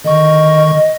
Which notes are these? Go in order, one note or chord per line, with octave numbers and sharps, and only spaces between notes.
D3 D#3 D#5 C#6